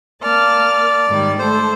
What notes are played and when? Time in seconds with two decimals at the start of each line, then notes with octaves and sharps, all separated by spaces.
0.23 A#3 D5 A5 F6
1.08 G#2 D#3 G3
1.39 A3 A4 C5